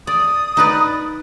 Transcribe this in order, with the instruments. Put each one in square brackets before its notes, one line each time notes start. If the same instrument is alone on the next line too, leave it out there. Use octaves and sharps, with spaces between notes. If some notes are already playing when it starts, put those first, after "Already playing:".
[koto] D5 [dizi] D#6
[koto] D#4 B4 D5